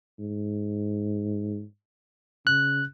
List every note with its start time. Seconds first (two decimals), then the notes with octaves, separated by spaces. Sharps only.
0.19 G#2
2.47 C#3 F#6